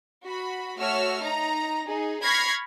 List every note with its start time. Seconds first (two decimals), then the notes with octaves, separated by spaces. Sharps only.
0.25 F#4 B5
0.77 A3 F#4 C#5 E6 F6
1.21 D#4 A#5
1.86 D#4 G#4
2.22 B5 C#6 F6 G#6 A#6 C7